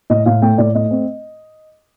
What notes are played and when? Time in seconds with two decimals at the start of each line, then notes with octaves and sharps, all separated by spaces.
0.10 A2 D#5
0.26 A2 F5
0.42 A3 G5
0.58 A2 D5
0.75 A3 D#5
0.91 C4